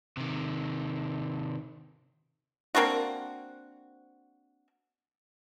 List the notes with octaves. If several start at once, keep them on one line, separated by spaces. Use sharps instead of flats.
C3 D#3
A#3 C4 D4 F#4